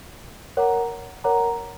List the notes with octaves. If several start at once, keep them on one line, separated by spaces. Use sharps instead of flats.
A#4 C#5 F#5 A#5 D6
A#4 C#5 F#5 A#5 D6